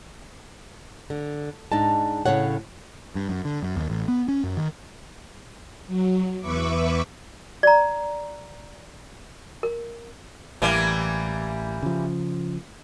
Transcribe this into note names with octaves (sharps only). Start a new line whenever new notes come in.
D3
G#2 D4 D#4 A5
A2 C#3 C#5 F#5
G2
F#2
D3
F#2
D#2
A1
B3
C#4
F#2
D#3
F#3
E2 B4 E5 C#6 D6
D5 A#5
A#4
A1 E3 G3 A#3
C#3 F3